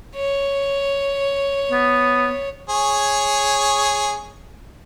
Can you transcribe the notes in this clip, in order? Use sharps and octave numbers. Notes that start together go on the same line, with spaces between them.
C#5
B3
G#4 C#5